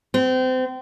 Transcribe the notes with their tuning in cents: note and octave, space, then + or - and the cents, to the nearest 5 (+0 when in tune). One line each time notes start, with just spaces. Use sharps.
C4 -30